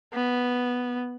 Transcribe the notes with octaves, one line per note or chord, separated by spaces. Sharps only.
B3